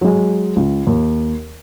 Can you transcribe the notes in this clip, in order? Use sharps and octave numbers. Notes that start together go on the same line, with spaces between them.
F#3 G#3
C#2
D#2